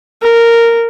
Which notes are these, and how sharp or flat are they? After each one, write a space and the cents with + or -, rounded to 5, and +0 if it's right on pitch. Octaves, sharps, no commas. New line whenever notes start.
A#4 -10